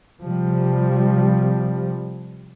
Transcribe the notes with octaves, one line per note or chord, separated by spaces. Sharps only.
C3 F3 G3